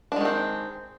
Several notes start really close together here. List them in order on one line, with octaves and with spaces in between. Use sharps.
D4 G#3 D#3 C4